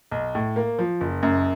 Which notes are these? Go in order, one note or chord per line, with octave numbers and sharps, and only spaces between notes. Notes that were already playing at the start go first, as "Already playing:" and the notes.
B1
A2
A#3
F3
F#1
F#2